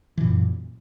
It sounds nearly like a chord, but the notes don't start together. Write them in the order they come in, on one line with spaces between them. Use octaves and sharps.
E3 A#2 F#2